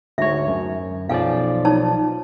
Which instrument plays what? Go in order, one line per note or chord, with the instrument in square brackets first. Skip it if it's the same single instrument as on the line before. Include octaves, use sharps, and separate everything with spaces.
[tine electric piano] D2 G#2 C#5 [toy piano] E5
[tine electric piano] F#2
[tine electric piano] B1 F3 D5 [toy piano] F5 G#5
[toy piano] D#4 C#5 A5